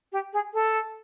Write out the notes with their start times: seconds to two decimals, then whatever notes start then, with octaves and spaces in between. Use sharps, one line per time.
0.12 G4
0.33 G#4
0.53 A4